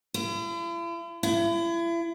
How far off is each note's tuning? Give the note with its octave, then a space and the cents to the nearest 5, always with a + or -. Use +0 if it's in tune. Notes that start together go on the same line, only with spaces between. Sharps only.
E4 +45
E4 +35